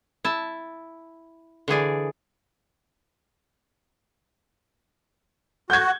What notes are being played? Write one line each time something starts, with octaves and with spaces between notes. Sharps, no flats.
E4 A5
D3 E3 G#4 D5
F#4 G6 G#6